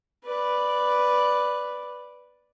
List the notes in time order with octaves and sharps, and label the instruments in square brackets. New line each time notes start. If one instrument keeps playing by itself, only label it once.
[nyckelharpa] B4 D5